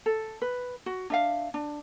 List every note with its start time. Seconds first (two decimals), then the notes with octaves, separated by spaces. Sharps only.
0.06 A4
0.42 B4
0.86 F#4
1.10 D4 E5 F5
1.54 D4